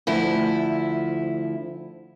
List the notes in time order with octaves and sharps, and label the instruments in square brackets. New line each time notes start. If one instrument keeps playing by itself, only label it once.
[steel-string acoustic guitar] D2 F3 E4